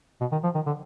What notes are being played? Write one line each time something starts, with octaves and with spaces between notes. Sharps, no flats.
B2
D#3
F3
D#3
D3